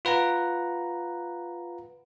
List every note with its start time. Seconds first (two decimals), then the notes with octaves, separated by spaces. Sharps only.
0.05 F4 B4 F#5 A#5